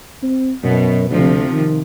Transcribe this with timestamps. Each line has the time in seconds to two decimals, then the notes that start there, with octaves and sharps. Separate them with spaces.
0.22 C4
0.64 F#2 B2
1.11 D2 C3 F3
1.52 D#3